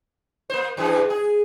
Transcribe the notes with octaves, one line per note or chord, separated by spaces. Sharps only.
A#3 C5
F#2 E3 G#4
G#4